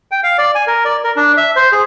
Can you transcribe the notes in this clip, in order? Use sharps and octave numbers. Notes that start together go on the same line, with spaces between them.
G5
F5
D5
G#5
A#4
D5
A#4
D4
E5
C5
G#4